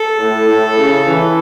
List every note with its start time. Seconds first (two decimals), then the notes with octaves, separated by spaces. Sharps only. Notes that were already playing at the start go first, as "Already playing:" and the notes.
Already playing: A4
0.18 A2
0.48 A2
0.78 C#3
1.07 E3